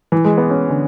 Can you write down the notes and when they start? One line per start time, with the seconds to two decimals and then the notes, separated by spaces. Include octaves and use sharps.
0.12 E3
0.25 G#3
0.38 B3
0.50 C#4
0.70 D3